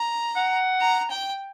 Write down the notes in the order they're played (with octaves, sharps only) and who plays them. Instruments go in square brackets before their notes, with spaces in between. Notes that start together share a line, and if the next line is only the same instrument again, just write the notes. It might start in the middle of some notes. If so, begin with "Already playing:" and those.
Already playing: [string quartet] A#5
[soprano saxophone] F#5
[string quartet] A#5
G5